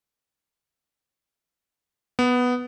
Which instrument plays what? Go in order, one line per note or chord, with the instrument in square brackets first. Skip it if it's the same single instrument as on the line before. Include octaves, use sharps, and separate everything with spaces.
[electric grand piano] B3